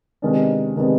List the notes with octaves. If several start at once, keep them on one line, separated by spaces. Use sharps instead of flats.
C3 D#3 G#3 B3 D4
C3 D#3 G#3 B3 D4